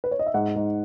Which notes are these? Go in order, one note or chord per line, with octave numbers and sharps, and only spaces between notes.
B4
C#5
D#5
E5
G#2 F#5
G#2